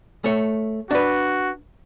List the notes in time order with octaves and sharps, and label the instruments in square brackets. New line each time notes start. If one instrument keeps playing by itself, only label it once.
[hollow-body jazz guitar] A3 C#5
[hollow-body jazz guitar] D4 B4 [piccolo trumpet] F#4